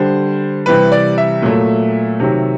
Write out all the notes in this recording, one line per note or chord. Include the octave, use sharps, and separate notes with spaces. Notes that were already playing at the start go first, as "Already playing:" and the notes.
Already playing: D3 G3 C5
C3 E3 G3 B4
D5
E5
A#2 F#3 A3
C3 D#3 F#3